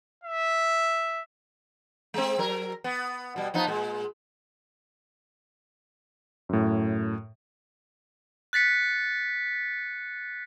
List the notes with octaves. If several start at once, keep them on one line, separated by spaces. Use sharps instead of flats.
E5
G#3 C4
F#3 A#4
B3
B2 G3
F3 B3 D#4
A#2 G#3
F#2 A2
F#6 A6 B6 C#7